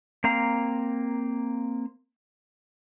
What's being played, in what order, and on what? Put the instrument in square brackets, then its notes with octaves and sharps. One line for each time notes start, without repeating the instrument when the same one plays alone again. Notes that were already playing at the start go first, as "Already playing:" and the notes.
[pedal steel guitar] A#3 C4 F5 A#5